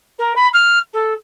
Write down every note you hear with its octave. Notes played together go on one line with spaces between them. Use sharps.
A#4
B5
F6
A4